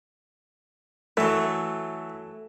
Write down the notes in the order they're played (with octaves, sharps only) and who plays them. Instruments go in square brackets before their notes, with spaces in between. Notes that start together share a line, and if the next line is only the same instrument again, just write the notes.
[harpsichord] E3 F#3 [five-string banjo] A3